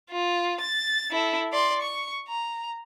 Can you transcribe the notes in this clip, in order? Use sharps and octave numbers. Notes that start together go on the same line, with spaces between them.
F4
A6
E4 A4
D5 C6
C#6
A#5